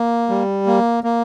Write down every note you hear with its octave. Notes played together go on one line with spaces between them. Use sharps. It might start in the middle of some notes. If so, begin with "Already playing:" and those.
Already playing: A#3
G3
A#3
A#3